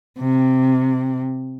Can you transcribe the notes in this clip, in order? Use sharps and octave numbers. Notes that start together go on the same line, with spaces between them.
C3